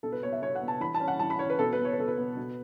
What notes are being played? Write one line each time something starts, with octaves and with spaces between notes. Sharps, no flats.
B2 A4
B4
B3 C#5
E5
B2 C#5
F#5
B3
A5
E3 B5
A5
C#4
F#5
E3 A5
B5
C#4 C#5
B4
B2 A4
B4
B3
C#5
B4
B2 A4
B4
B3
B2